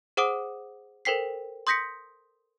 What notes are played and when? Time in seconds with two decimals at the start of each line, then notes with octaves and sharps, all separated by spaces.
0.17 G#4 C5 F#5 D6 D#6 D7
1.05 A4 A#4 C5 G5 B6 C7
1.67 C6 D#6 G6 A#6 B6 C#7